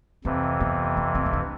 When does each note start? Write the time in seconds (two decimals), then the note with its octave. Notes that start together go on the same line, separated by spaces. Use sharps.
0.25 F2 C3 E3 C4
0.60 B3
0.97 B3
1.15 C4
1.26 C4
1.33 D4